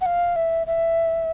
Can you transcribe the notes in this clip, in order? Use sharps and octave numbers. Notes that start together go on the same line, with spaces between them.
F#5
F5
E5
E5